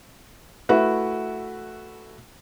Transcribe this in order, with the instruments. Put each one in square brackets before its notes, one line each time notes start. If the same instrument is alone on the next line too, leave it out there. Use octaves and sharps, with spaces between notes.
[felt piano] A3 E4 F#4 B4